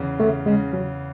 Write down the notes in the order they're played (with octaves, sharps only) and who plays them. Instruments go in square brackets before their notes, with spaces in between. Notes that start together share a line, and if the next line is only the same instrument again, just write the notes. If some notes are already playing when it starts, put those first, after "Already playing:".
Already playing: [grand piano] E2 C#3
[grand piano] C#3 [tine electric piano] A3
[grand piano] C#3 [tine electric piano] G#3
[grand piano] C#3 [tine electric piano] F#3